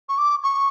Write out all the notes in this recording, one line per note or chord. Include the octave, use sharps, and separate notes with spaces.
C#6
D6
C#6